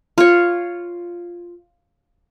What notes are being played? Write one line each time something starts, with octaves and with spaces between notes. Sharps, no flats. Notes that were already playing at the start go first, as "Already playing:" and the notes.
F4 C#5